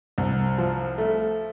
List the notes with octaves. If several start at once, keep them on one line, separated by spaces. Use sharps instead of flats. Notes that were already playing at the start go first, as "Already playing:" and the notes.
C2
F3
A3